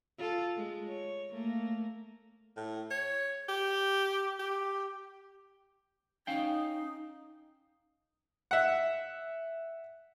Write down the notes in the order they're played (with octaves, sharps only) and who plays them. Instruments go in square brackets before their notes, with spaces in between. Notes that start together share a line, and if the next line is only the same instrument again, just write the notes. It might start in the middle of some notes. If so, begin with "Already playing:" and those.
[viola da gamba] F4 A4
G#3
C#5
A3 A#3
[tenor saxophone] A2
C#5
G4
G4
[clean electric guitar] C#4 F5 G5 [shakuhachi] D#4
[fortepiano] E5 F#5